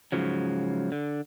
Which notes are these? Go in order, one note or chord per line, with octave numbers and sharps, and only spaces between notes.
G#2 C#3 F3 F#3
D3